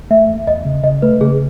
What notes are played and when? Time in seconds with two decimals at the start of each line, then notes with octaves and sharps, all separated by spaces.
0.11 A3 E5
0.29 E2
0.47 E2 D#5
0.65 C#3
0.83 C#3 D#5
1.02 A3 B4
1.21 C#3 G#4